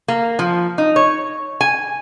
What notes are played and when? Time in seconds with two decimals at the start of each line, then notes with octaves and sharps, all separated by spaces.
0.08 A#3
0.39 F3
0.78 D#4
0.96 C#5
1.61 G#5